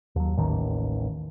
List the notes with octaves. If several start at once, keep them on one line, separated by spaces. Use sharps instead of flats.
D#2 F#3
A1 D#2 D#3